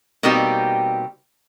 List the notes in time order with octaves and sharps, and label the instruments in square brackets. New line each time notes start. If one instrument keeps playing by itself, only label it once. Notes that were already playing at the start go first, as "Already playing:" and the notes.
[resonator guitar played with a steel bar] B2 G3 A#3 C4 D#4 G4